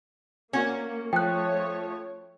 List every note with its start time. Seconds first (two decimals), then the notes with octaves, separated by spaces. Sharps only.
0.53 A#3 C#4 F#4
1.13 F3 A3 C#5 G5 F#6